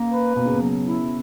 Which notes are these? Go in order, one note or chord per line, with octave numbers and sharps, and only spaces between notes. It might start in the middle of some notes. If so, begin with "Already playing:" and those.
Already playing: C#3 A#3
B4
B2 A#3
C#3
B2
F#3
E4